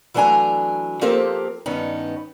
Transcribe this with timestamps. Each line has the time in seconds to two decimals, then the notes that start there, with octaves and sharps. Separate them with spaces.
0.14 E3 F#3 A3 D4 G#5 A#5
1.01 F3 A#3 C4 G4 A4 A#4
1.66 G2 D#3 B3 C#4 D#4